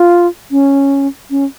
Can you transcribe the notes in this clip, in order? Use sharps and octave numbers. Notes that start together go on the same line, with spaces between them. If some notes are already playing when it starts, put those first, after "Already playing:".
Already playing: F4
C#4
C#4